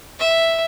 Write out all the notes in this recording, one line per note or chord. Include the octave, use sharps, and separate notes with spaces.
E5